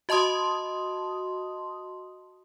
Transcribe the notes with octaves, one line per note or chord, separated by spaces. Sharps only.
F#4 D#5 A5 C6 D#6